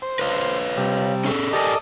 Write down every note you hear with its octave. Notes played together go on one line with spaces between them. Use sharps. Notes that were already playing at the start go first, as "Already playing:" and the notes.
C5
B4 C#5 F5
C3 G3
C#4 G#4 A4
G4 A4 A#4 D5 D#5 G#5